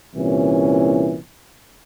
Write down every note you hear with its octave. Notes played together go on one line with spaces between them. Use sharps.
C2 A#2 E3 C#4